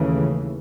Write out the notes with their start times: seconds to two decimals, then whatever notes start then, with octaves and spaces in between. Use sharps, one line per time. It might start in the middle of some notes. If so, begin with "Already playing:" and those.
Already playing: D#2 C#3 E3 A3